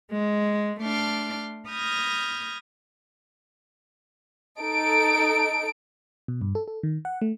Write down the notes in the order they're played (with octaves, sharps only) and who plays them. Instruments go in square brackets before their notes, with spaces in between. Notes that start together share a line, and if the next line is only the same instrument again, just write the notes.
[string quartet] G#3
A3 D4 C6 D6 F6
B5 D#6 F6 G6 G#6 A#6
[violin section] D#4 A4 D7
[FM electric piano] B2
G2
A4
A4
D#3
F#5
A3